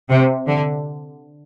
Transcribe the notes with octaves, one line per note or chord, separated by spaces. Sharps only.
C3
D3